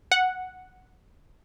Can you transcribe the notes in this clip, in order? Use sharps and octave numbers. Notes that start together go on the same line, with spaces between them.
F#5